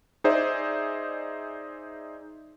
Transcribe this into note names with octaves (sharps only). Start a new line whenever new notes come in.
D#4 G#4 C5 D5 E5